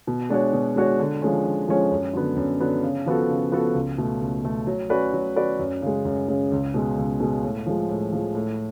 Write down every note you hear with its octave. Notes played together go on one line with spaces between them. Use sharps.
B2
G#3 D4 F#4 C#5
B2
G#3 D4 F#4 C#5
D3
F3 G#3 C#4
D3
F3 G#3 C#4
F#2
D3 F#3 B3
F#2
D3 F#3 B3
C#3
F3 B3 F#4 A4
C#3
F3 B3 F#4 A4
C#2
B2 A3
C#2
B2 A3
F#3
C#4 F#4 B4 D5
F#3
C#4 F#4 B4 D5
F#2
C#3 G#3
F#2
C#3 G#3
C#2
B2 G#3
C#2
B2 G#3
A2
F3 G#3
A2
F3 G#3
A2